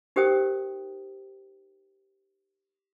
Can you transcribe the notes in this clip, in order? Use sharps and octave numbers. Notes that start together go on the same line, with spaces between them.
D#4 G4 A#4 C5 G5 D#6